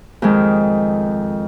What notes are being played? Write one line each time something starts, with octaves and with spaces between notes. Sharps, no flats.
F2 D#3 G#3